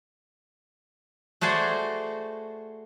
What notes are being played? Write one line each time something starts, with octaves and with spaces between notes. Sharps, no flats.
A3 F#4 G#4 C5 D5